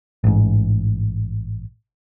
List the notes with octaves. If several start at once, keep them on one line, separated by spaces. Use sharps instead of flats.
A1 G#2